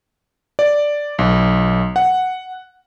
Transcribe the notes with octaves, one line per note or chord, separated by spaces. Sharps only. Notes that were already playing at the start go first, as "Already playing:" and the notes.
D5
B1
F#5